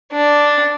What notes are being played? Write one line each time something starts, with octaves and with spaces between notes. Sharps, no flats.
D4